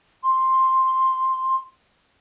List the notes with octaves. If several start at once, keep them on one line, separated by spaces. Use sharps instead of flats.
C6